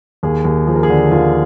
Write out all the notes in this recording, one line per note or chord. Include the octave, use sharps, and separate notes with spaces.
D#2 G#4
D#2
F3 G#4
A#4
G#4
D3
D#2 F4